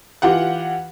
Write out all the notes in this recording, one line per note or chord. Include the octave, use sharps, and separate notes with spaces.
E3 F4 G4 F#5